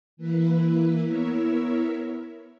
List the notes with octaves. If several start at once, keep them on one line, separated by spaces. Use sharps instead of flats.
E3 A#3 E4 B4
B3 E4 A#4 C#5 E5